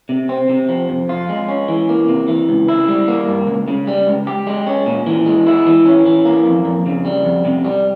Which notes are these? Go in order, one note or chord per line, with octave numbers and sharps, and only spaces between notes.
C3
C4
C3
F3
F2
F4
G#3
C#4
E3
A#3
C3
E3
C#2
E4
G3
A#3
G2
C#2
C#3
G3
C#2
G4
G#3
C#4
A#2
E3
G#3
E4
E3
C#4
E3
A#3
F2
F2
C#3
G3
F2
C3
G3